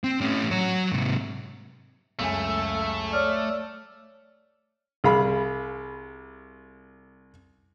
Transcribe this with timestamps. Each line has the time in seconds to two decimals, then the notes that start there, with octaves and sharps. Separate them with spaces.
0.04 C4
0.21 A2 C#4
0.51 F#3 C#5
0.92 G#2 C3
2.19 C#2 F#2 A3 G#5
3.13 C#5 D5 F6
5.04 C2 G#4 F5 B5